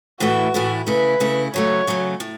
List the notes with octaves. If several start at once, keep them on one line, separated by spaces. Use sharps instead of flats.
A2 E3 A3 E4 F#4
A2 E3 A3 E4
C#3 A3 E4 B4
C#3 A3 E4
C#3 F#3 A3 C#5
C#3 F#3 A3
A2